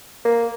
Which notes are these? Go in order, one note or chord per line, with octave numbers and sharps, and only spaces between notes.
A#3